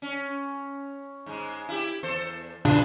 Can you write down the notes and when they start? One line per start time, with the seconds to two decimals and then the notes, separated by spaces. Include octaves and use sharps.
0.02 C#4
1.26 G#2 G#3
1.69 E4 G4
2.03 E2 A4 C5
2.65 E2 A#2 C#3 D4 G#4 B4